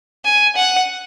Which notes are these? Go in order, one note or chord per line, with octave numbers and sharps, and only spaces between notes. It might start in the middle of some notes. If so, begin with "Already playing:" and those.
G#5
F#5